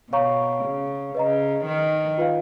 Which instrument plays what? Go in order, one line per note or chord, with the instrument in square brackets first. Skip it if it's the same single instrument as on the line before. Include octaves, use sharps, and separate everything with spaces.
[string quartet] B2 [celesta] C#5 F5 A#5 C#6
[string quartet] C#3
[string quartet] C#3 [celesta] B4 D#5 A#5
[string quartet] D#3
[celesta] F4 B4 F5